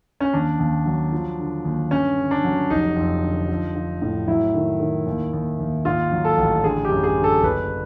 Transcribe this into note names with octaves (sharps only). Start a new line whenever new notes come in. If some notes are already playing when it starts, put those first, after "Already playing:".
C#4
D#2 D4
D#2
F#3
F3
D3
D#2
G2 C#4
D3
D4
F#3
F1 D#4
F2
D3
F3
F3
A2
F#3 E4
D#3
D#3
D#2
D#2
D#2
G#2 F4
F#3
A4
A1
D3 G#4
G4
F#2
G#4
D3
A4
F#1 B4